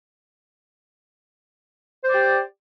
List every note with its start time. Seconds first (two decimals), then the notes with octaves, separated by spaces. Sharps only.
2.03 C5
2.08 D5
2.13 G4